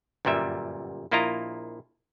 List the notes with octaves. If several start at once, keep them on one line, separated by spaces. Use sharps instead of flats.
G1 F#2 A#2 G3 E5
A#1 A#3 E4 F4 D#5 A#5